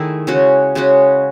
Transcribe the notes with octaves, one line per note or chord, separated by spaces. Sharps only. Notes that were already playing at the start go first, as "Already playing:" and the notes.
Already playing: D#3 A3 E4 G#4
C#3 G#3 C#4 F#4
C#3 G#3 C#4 F#4